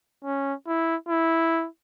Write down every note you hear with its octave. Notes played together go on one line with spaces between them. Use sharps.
C#4
E4
E4